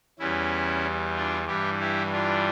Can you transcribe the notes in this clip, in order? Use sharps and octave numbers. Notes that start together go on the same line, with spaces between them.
E2 E3 G3 C#4 E4
D4 F4
G2 E3 G3 E4 G4
E4 G4
D4 F4